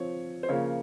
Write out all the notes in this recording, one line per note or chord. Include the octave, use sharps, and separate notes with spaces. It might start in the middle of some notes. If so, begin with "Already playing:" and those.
Already playing: F3 C4 C#5
C5
C#3 F3 A#3 C#5